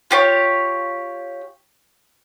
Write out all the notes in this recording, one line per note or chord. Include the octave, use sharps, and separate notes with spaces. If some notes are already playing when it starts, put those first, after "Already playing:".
F4 G4 C#5